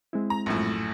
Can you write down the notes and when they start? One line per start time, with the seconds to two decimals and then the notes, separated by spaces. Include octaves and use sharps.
0.13 G#3 C4 E4
0.30 A#5
0.46 A#1 F#2 A2